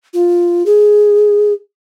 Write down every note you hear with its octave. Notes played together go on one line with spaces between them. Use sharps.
F4
G#4